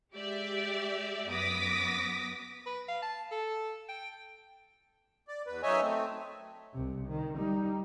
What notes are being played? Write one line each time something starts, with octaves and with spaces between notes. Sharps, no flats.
G#3 G4 D5 E5
F#2 B3 D6 D#6 A#6 B6
B4
F5
A5
A4
G5
D5
E2 B4
F#2 D#4 C#5 D#5 E5 G#5
A3 C4
C2 C3
D#3
G3 D#4